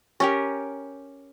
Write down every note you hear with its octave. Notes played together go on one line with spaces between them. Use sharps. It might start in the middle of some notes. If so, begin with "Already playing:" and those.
C#4 G4 A#4